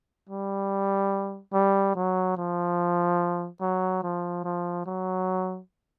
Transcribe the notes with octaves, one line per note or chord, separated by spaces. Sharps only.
G3
G3
F#3
F3
F#3
F3
F3
F#3